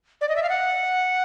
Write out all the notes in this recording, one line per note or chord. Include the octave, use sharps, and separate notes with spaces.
D5
D#5
E5
F5
F#5